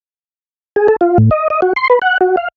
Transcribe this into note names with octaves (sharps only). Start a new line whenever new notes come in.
G#4
A4
F4
A2
D#5
D#5
F#4
C6
B4
F#5
F#4
F5